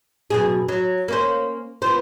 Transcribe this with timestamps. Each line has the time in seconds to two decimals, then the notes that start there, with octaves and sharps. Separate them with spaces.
0.30 F#2 B2 G#4
0.69 F#3
1.08 A#3 C#4 C5
1.82 B3 F4 C5